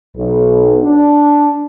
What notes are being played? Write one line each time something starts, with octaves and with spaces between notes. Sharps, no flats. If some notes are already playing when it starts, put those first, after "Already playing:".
B1
D4